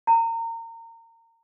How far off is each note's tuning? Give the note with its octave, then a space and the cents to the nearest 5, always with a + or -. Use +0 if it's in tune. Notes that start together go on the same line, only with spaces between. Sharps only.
A#5 -30